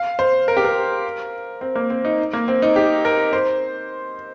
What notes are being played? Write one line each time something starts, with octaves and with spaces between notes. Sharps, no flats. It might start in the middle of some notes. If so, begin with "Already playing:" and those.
Already playing: F5
C5
A#4
G4
A#4
C4
A#3
C4
D#4
A#3
C4
D#4
G4
A#4
C5